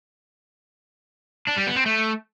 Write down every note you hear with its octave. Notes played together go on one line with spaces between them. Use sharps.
D4
G3
B3
C4
A3